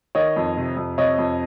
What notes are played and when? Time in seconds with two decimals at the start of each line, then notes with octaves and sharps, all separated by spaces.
0.15 D#3 C#5 D#5
0.36 F2
0.57 C3
0.77 F2
0.98 C3 C#5 D#5
1.18 F2